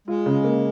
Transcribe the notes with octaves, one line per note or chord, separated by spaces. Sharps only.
G#3 F4
C#3
A#3